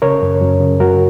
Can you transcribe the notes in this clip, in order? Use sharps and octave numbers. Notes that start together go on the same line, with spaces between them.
C#3 A#4 C#5
F#2
F#2
C#3
F#2 F#4 A#4